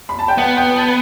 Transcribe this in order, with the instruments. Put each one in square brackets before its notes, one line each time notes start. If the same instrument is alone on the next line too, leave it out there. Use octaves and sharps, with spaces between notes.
[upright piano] B5
A5
G5
[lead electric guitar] B3 [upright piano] F#5
[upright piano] G5
A5